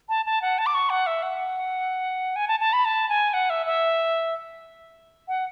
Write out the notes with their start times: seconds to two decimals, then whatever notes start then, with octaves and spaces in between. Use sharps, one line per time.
0.09 A5
0.26 A5
0.42 F#5
0.58 A5
0.66 D6
0.74 C#6
0.90 F#5
1.07 E5
1.23 F#5
2.36 G#5
2.48 A5
2.60 A5
2.73 B5
2.85 A5
3.09 G#5
3.34 F#5
3.50 E5
3.66 E5
5.28 F#5